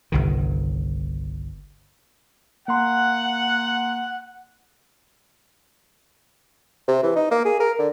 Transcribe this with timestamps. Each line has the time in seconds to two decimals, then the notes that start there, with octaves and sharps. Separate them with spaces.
0.12 G1 C2 D#3
2.68 A#3 F#5 A#5 C6
6.88 C3
7.03 E3
7.16 D#4
7.31 A#3
7.45 G#4
7.60 A#4
7.79 D3